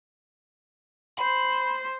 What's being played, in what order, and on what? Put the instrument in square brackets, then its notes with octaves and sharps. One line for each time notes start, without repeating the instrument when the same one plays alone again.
[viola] C5 [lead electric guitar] B5